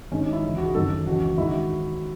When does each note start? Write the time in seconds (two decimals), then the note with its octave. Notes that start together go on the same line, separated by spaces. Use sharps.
0.11 G#1 G#2 D#3 C#4
0.22 D#4
0.33 E4
0.43 C#2 C#3 E3
0.57 F#4
0.65 G#4
0.74 G#1 F#2 D#3 A4
1.06 C#2 C#3 E3 F#4
1.38 G#2 D#3 E4
1.48 F#4